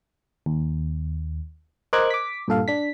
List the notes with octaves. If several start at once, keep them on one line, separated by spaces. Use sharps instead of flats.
D#2
A#4 C5 D#5 D6 F#6 G#6
D6 B6
G2 A#2 A4 F5
D4 B6